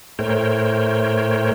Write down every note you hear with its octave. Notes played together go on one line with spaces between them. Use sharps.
A2 A3 A#4 C5 C#5 G5